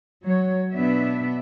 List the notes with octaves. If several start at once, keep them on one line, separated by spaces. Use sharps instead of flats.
F#3 C#5
B2 B3 D4 E5